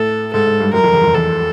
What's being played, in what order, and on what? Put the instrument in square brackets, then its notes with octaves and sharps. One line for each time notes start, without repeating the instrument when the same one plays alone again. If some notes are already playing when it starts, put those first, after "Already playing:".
Already playing: [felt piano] A2 [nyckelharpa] A4
[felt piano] G#2 [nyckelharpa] A4
[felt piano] G#2
G2
[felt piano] F#2 [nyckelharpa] A#4
[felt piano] F2
E2
F2
[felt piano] E2 [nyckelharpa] A4